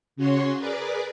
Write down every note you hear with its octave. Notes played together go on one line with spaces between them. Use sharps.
C#3 C#4 F#4 C#5 C6
G#4 A#4 B4 D5 D6